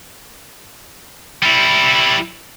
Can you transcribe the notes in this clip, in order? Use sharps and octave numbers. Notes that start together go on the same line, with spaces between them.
G3 E4